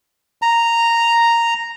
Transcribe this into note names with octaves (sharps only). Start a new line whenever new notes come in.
A#5